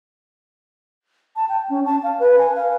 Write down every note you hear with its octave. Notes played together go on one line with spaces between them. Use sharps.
A5
G5
C#4
A5
F5
B4
G#5
F5